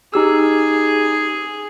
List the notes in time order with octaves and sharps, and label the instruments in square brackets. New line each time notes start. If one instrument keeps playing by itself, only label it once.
[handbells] D#4 G4 E6 [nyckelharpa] G#4